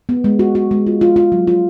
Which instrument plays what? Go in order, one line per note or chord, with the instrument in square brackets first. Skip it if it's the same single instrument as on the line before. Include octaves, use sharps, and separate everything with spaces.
[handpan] B3
G#3
F#4
F#4
G#3
F4
F4
F4
F#3
F4